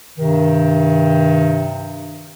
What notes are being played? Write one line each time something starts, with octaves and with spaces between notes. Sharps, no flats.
G2 C3 D#3